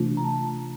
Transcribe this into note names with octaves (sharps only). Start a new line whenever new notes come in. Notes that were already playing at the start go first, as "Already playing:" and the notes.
Already playing: C3 E3 A3 D4 F4
A#5
A5